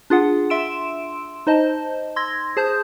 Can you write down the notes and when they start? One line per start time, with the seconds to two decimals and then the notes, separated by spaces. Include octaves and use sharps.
0.10 D4 F4 G#4 F#5
0.50 E5 C6 E6 D7 E7
1.47 D#4 C5 D#5 A5
2.16 C6 E6 G#6 A#6
2.57 G#4 C5 A5 D#6 G6